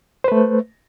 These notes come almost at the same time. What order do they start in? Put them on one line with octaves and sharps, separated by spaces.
C5 B4 A3